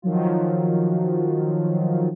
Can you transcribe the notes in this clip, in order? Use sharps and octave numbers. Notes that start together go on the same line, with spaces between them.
D#3 F3 F#3 F4